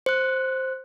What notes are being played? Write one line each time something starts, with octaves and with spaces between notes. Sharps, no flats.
C5 F#6